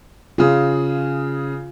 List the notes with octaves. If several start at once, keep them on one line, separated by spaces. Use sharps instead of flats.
C#3 F4 G#4